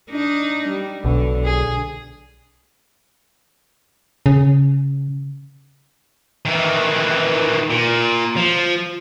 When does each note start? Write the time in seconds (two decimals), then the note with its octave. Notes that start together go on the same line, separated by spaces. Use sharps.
0.10 D4 D#4
0.68 G3
1.05 B1 D3
1.45 G#4
4.26 C#3
6.46 D#3 E3
7.70 A#2
8.37 F3